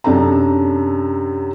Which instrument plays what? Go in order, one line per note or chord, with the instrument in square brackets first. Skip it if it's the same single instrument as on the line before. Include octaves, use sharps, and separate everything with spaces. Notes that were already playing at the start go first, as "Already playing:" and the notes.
[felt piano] F#2 C3 D4 A4 A#5